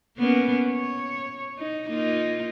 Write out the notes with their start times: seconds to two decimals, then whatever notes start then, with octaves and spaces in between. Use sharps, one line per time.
0.17 A#3 B3 C#4
0.69 C#5
1.58 D#4
1.88 A#3 D#4 F4